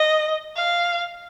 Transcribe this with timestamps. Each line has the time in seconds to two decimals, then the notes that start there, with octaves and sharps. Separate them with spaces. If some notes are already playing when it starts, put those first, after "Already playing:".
Already playing: D#5
0.56 F5